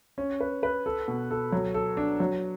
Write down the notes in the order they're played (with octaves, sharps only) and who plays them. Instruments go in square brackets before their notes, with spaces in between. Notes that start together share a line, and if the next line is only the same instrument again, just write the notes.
[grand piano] C#4
B4
B4
A4
B2
A4
F#3
A4
D4
F#3